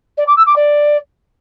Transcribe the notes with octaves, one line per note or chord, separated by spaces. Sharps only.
D5
D6
E6
D6
D5